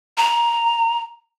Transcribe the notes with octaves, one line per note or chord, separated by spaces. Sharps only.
A#5